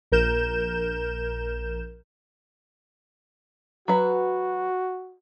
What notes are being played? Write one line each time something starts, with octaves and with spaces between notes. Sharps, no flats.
A#1 A#4 G6 E7
F#3 F#4 B4